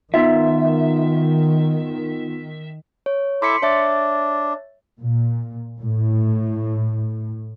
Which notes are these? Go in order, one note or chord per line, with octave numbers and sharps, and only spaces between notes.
D#3 B3 D#4 F4 E5
C#5
E4 A4 C6 D6 B6 C#7
D4 C#5 E5 A6
A#2
A2